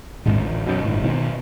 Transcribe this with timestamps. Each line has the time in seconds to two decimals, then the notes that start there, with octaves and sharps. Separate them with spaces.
0.26 D#1 G#1 G#2
0.37 A1 D2
0.66 F#2 B2
0.84 G1 A2
1.03 B2 D#3 A#3 B3